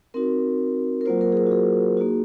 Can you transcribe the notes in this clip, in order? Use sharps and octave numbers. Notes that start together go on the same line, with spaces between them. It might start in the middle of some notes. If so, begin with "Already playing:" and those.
C4 D#4 F#4 A#4
A#4
F#3 A#3 F4 C5
A#4
G#4
A#4
F#4
G#4
A#3 D#4 F#4